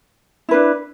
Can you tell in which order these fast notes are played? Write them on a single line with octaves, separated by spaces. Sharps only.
E4 B4 D4